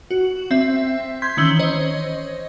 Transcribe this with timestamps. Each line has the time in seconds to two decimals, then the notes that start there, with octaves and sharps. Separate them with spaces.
0.11 F#4
0.51 C4 E5
1.22 C6 G6 G#6 B6
1.37 D#3 E3 C#4 E6 F#7 G7
1.59 C5 C#5 D#5